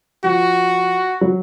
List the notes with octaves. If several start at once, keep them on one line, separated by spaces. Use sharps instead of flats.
F3 F#4
F#3